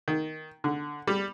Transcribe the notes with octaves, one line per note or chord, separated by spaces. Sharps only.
D#3
D3
G3